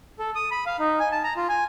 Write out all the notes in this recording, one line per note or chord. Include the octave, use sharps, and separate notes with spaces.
A4
D#6
B5
F5
D#4
G#5
A5
A#5
F4
G#5